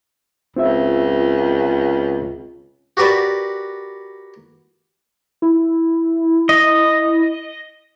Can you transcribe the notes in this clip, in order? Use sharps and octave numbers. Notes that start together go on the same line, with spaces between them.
C#2 C4 F4 E5
F#4 G4 A#4 B4 D5
E4
D#5